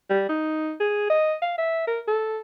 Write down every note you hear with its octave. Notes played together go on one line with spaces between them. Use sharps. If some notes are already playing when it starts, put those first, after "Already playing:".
G3
D#4
G#4
D#5
F5
E5
A#4
A4